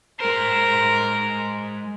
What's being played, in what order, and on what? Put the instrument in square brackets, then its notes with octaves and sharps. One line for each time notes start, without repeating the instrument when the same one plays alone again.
[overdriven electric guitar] G#3 C5 [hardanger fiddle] A#4